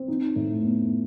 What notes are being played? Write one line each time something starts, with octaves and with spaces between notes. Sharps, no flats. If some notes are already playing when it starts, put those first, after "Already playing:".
Already playing: C4
D#4
A2
B3